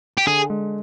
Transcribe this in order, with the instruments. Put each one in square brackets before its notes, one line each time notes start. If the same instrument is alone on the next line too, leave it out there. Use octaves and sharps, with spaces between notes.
[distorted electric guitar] G4
[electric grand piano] D3 [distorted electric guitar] G#4
[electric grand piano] G#3